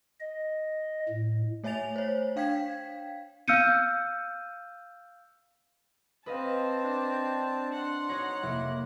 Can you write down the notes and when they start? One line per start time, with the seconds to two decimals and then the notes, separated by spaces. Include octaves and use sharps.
0.20 D#5
1.09 A2
1.64 A3 C#5 E5 G#5 A6 F7
1.96 C5 C#5
2.36 D4 F5 G5 G#6 B6
3.48 F5 E6 F6 G6 C#7 D#7
6.26 C4 B4 D#5 F5 A5
6.84 D4
7.74 F#5 C6
8.09 D#4 F#4 C#5 A#5
8.43 F1 A#3 E4